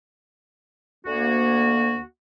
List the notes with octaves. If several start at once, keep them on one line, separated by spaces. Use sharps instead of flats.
D2 A#3 F#4